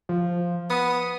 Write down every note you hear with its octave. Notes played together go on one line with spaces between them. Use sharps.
F3
B3 D#6